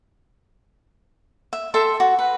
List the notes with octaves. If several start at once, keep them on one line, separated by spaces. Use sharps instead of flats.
E5
A4 E5 G5 C6
F#4
B4